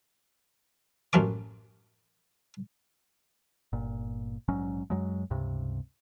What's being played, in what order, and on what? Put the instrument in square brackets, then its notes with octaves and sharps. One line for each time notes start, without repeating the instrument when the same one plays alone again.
[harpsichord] A1 F#2 A#3 C#4 D6
[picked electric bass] G1 A#2
A#1 G#2 F#3 C#4
F#2 F#3 G#3
C#2 G2 C3